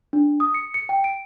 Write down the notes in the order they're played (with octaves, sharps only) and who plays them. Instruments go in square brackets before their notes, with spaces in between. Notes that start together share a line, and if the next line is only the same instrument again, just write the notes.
[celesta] D4
D#6
C#7
C#7
G5
D7